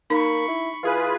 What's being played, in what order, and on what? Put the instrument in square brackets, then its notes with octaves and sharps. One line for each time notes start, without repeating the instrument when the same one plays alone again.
[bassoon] A#3 [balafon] D#4 [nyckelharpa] B5 C#6
[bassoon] E4
[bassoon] E3 [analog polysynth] F4 G#4 B4